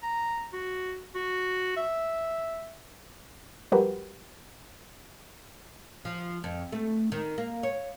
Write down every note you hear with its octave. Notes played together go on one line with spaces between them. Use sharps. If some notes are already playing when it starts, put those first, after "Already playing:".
A#5
F#4
F#4
E5
F3 G3 F#4 G4 A#4 B4
F3
F2
A3
D#3
A#3
C#5